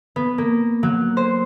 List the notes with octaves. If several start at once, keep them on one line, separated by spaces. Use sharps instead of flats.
B3
A#3
F#3
C5